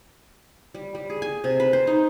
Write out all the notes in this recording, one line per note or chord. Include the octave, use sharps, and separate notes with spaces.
G3
G3
G#4
G#5
C3
B4
C5
D#4